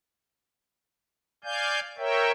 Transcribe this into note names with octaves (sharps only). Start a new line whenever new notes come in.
D5 F5 G#5 G6
A#4 C#5 E5 G5